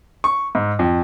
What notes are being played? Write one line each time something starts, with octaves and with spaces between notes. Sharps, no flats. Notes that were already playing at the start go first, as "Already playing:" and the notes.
C#6
G#2
F2